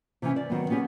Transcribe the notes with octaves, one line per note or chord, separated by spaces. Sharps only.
C3 E3 C#4
D5
D#3 F#3 B3
B3 C#4 G4 G#4